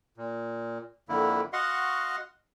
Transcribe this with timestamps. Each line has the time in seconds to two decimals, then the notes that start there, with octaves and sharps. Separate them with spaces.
0.17 A#2
1.09 F2 D3 A#3 E4
1.53 F#4 D#5 F5 F#5 C6 C#6